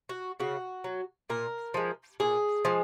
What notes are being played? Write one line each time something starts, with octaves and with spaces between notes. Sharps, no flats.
F#4
C#3 F#4
F#3
A#2 A#4
F3 G#3
A#2 G#4
F3 G#3